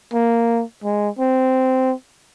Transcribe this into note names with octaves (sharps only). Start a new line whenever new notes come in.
A#3
G#3
C4